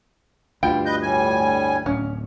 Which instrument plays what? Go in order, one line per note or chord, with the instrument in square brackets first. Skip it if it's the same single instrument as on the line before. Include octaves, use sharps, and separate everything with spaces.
[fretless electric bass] D2 G2 [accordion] G3 [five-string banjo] E4 F4 G5
[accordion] B4 D#5 G6
A2 G3 G#5
[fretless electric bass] D1 [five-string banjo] C#4